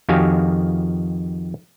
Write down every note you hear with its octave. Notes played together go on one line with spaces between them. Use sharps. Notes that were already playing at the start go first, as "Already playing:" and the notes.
F2 D#3 F#4 G4 F5 G#5